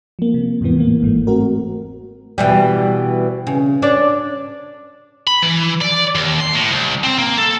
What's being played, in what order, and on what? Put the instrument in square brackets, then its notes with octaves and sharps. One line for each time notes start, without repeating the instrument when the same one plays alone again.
[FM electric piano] F3 A#3
C3
E2 G#2 C3 E3 B3
A2 E3 A#3
G1 G#2 E3 A3
A3 C4 F#4 A#4
[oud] B2 E3 G3
C#3
D4 C#5 D5
[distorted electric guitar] B5
E3
D5
D#2
C6
A2
C2
C4
A#3
A4